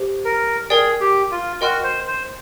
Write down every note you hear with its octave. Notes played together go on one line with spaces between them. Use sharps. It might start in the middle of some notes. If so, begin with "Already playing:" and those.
Already playing: G4 C5
A#4
G#4 A#4 D5 G5
G4
F4
F#4 A#4 D#5 G5 C6 F6
C5
C5